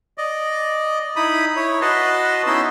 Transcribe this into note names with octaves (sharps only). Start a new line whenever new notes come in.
D5 D#5
D#4 E4 B5 D#6
E4 C#5
F#4 B4 D#5 A5 C6
B3 C#4 D#4 E4 C6 E6